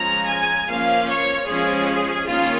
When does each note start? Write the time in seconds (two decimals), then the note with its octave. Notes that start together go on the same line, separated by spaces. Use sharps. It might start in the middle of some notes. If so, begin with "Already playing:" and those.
Already playing: F3 G#3 C#4 A#5
0.29 G#5
0.69 F3 A#3 C#4 F5
1.09 C#5
1.48 F3 G#3 C#4 G#4
2.27 D#3 A#3 C#4 F4